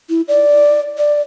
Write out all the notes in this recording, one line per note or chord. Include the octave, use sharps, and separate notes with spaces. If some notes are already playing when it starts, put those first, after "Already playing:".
E4
D5
D5